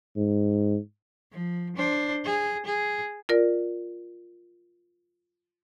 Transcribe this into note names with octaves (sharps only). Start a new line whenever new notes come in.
G#2
F3
D4 C5
G#4
G#4
F4 A#4 D5